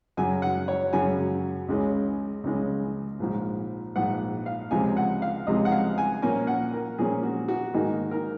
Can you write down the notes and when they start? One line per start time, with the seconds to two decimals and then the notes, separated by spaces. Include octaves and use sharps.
0.17 F#2 C#3 F#3 G#5
0.42 F#5
0.68 C#5
0.93 F#2 C#3 F#3 G#5
1.69 C#2 C#3 G#3 C#4
2.44 C#2 C#3 G#3 C#4
3.20 A#1 G#2 F3
3.96 A#1 G#2 F3 F#5
4.46 F5
4.71 C#2 C3 F3 G#3 G#5
4.97 F#5
5.22 F5
5.47 C#2 C3 F3 G#3 D#5
5.65 F#5
5.72 F5
5.98 G#5
6.22 A#2 F3 A#3 C#4 G#5
6.47 F#5
6.73 A#4
6.98 A#2 F3 A#3 C#4 G#4
7.23 F#4
7.48 F#4
7.74 G#2 D#3 A#3 D#4 G#4
8.11 A#4